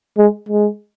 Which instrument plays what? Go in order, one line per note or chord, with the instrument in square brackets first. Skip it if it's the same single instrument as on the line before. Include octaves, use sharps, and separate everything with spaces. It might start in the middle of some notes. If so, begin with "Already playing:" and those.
[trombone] G#3
G#3